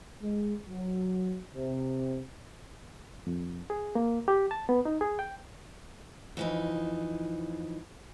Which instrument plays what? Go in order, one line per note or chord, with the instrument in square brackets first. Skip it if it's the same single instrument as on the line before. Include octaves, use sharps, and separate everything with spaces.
[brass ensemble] G#3
F#3
C3
[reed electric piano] F2
G#4
A#3
G4
A5
B3
D#4
G#4
G5
[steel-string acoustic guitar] F2 E3 D#4